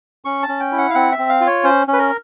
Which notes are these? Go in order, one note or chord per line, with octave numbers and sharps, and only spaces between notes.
C#4 C#6
A5
C#4
G5
E4
F#5
F5
C4 F#5
E5
C4
F5
F4
C#5
C#4 C5
C#4
B4
A#4